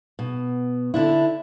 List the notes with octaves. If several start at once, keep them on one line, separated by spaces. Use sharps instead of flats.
B2
D3 D4 E4